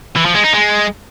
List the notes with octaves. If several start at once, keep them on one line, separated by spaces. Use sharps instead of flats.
E3
F3
G#3
D#4
G#3